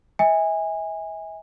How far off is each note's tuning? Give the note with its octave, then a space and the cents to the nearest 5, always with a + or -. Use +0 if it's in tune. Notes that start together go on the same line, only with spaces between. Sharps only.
E5 -35 G#5 -20